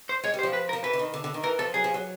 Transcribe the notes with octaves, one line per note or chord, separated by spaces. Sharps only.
C5
G#3 C#5
G3
C5
F3
B4
A#4
F3
E3 B4
D3
D#3
D3
D3
D#3
E3 A#4
F3 A4
F#3 G#4
F3
F#3